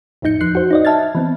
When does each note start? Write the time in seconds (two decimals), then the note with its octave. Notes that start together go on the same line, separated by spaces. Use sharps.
0.22 G#1 F2 A2 D#4 G6 C#7
0.40 E2 F3 F#6 C7
0.55 F#4 C5
0.71 D#4 D5 D#5
0.85 E5 A5 F6 G#6 A6
1.15 E3 B3 C4